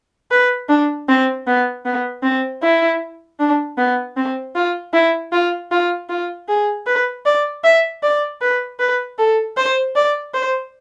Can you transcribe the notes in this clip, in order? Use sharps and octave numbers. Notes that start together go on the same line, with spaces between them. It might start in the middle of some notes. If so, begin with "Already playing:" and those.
B4
D4
C4
B3
B3
C4
E4
D4
B3
C4
F4
E4
F4
F4
F4
G#4
B4
D5
E5
D5
B4
B4
A4
C5
D5
C5